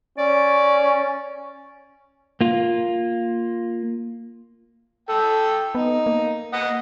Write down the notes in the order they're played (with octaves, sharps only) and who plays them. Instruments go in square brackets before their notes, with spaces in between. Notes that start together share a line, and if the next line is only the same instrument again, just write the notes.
[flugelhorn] C#4 [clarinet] D5
[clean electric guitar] A#3 F4
[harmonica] A4 G5
[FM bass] B3 [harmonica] D#4
[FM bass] A#3
[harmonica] D#5 F#5